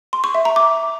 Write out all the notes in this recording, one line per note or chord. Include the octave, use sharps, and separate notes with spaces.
C6
C#6
E5
A#5
D6